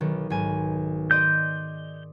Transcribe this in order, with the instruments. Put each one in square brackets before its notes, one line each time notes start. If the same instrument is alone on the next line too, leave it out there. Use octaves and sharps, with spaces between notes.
[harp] B1 D#3
B1 G#2 G#5
[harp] D5 D#5 C6 [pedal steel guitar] G6